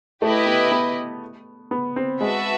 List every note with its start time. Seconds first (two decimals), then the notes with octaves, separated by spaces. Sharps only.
0.22 A3 E4 G4 B4 D#5
0.47 B3
0.72 B3
1.71 B3
1.96 C4
2.20 G#3 F#4 B4 E5 A5